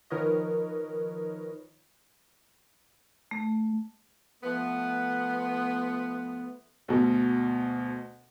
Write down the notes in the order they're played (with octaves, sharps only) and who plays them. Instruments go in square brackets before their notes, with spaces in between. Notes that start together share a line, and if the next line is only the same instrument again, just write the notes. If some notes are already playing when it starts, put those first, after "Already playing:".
[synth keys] D#3 F3 A#4 B4 C#5 D#5
[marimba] A3
[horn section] F3 A3 B3
[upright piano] D2 B2